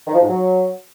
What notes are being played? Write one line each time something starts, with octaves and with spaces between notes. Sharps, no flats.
D#3
F3
G#2
F#3